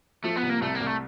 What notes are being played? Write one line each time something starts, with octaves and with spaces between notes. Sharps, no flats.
F3 A3
B3
C2
A#3
C2 A3
A#3
C2
A3